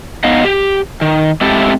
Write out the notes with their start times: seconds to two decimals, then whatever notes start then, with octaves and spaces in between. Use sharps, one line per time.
0.24 B3 D#4 D#5 F5
0.45 G4
1.01 D#3
1.41 G#3 A3 C4 E4 G4 A4